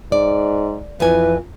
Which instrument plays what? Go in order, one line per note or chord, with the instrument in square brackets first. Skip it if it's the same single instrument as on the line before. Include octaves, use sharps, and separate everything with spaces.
[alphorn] G#2 [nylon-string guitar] D5
[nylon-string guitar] F2 G#5 [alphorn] E3 [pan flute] B4